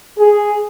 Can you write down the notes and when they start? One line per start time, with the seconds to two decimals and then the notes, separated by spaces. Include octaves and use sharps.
0.18 G#4